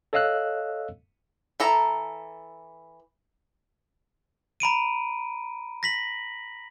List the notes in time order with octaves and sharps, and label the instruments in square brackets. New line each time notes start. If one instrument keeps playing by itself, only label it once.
[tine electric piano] A4 C#5 D#5 F5 E6 F#6
[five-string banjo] E3 A4 A#5
[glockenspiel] A#5 B5 D7 D#7
A#6 B6 F#7